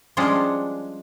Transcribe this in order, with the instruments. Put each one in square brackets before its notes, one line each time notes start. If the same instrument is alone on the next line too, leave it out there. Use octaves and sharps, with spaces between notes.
[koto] F3 G3 G#3 C#4 D4 F4